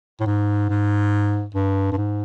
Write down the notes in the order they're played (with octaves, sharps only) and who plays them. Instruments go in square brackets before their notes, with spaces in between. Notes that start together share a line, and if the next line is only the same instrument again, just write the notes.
[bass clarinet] A2
G#2
G#2
G2
G2
G#2